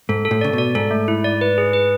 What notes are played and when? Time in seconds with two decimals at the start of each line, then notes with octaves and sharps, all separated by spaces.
0.09 G#2 A4
0.25 A4
0.31 A2
0.41 C#3 D5
0.53 B2
0.58 D5
0.75 G#2 A4
0.91 A3
1.08 E4
1.24 D5
1.41 B4
1.58 G#4
1.73 B4